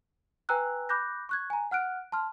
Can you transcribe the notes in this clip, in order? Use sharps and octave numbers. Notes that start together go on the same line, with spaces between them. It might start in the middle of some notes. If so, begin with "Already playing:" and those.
B4 G5 G#5 A#5 E6 F#6
B5 D6 F#6 G6 A#6
C#6 F#6 G#6
G#5 A#5
F#5 F6 F#6 D7
A5 C6 F6